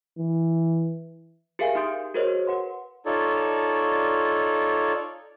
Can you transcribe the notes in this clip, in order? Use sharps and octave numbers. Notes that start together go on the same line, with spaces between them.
E3
G4 G#4 A#4 E5 F5 G#5
D#4 G4 C6 D#6 G6 D7
F#4 G#4 A#4 C5 C#5 D#5
B4 F#5 C6
D#4 F4 A4 C#5 D5